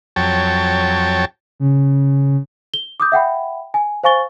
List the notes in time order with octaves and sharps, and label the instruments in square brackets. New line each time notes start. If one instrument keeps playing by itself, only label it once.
[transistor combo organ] F2 F#3 C#5 G5 A5
[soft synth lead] C#3
[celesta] G7
D6 D#6 G6
E5 F#5 G5 B5
G#5
C5 F5 G#5 C#6 A6 G7